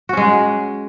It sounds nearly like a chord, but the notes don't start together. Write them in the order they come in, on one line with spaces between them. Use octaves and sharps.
F#4 C#4 G#3